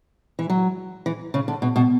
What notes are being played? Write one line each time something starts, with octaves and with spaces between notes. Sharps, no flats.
E3
F#3
E3
C#3
D3
B2
B2